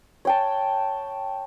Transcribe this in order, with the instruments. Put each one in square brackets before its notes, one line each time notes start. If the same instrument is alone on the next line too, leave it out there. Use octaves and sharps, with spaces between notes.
[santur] C#5 G5 A5